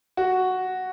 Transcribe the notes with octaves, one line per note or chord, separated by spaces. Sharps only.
F#4